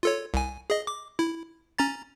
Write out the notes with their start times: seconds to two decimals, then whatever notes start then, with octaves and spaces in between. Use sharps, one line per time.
0.03 F4 A4 C#5
0.34 C2 G#5
0.70 G#4 D#5
0.87 D6
1.19 E4
1.78 C#4 A#5 A6